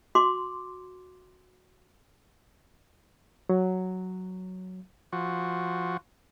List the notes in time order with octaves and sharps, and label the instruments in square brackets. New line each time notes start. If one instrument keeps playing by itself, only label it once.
[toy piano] F#4 C6 D6
[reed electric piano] F#3
[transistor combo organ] F3 F#4